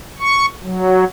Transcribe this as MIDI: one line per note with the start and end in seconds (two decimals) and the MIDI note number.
0.19 0.46 85
0.63 1.05 54